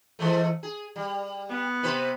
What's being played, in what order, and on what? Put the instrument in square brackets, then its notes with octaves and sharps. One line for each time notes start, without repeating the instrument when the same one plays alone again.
[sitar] E3 G#3 A3
G#4
G3
[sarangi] B3
[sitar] C3 B4 C5